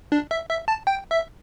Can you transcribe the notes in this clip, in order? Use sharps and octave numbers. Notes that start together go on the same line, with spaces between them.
D4
E5
E5
A5
G5
E5